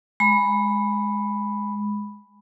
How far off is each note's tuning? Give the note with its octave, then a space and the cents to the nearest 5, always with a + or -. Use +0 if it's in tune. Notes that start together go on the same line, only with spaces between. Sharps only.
G#3 +0 B5 +0